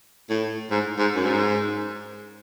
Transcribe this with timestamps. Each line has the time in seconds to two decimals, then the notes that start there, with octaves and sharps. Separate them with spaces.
0.30 A2
0.71 G#2
0.98 G#2
1.15 F#2
1.25 G#2